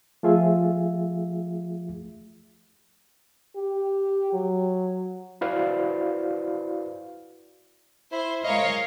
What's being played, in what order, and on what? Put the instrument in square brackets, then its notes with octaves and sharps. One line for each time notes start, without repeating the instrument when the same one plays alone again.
[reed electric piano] F3 A3 F4 G#4 E5
[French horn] G4
F#3
[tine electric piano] E4 F#4 B4 C5 D5 F5
[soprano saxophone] E4 [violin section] C5
[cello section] G#3 F5 [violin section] A#4 C#5 [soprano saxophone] D#5